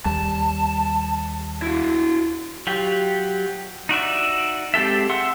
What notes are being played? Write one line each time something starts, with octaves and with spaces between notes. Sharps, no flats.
D#2 G3 A5
E4 F#4
F#3 F4 G4
D#4 F#4 D5 E5
G#3 C4 G4 A4 E5
E5 F#5 C6 E6